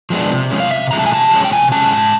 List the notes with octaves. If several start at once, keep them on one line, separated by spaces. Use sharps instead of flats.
F3 G#3 B3 D4
C3
F3 G#3 C#4
F5
C3 E5
F3 G#3 C#4 A#5
A5
G#5
C3 A5
F3 G#3 C#4
G5
C3 G#5
F3 G#3 C#4 A5
G#2